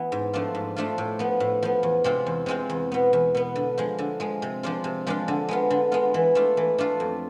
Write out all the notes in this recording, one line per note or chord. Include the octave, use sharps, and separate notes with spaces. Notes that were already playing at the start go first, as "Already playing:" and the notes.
Already playing: E3 B3
G#2
F3 A3 D4 F4
G#2
F3 A3 D4 F4
A2
F3 B3
A2
F3 B3
E2
C3 G#3 C4 F4
E2
C3 G#3 C4 F4
E2
B2 B3
E2
B2 B3
D3
F3 G#3
D3
F3 G#3
C3
F3 G#3 D4 F4
C3
F3 G#3 D4 F4
D3
G#3 B3 F4
D3
G#3 B3 F4
E3
A3 D4 F4
E3
A3 D4 F4
F2